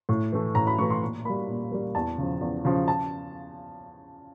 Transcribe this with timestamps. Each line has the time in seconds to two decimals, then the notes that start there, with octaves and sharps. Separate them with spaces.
0.09 A2
0.32 E3 A3
0.55 A2 A#5
0.67 B5
0.78 E3 A3 C#6
0.90 C6
1.02 A#2
1.25 G3 A#3 B5
1.49 A#2
1.72 G3 A#3
1.95 E2 A5
2.18 C#3 F3
2.41 E2
2.65 C#3 F3
2.88 A5